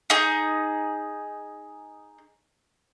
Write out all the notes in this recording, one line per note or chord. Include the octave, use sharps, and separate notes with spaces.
D#4 G#4